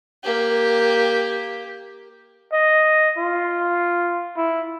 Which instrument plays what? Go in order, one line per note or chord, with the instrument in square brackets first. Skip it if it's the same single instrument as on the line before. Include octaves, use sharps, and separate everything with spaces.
[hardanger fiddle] A#3 G4
[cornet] D#5
F4
E4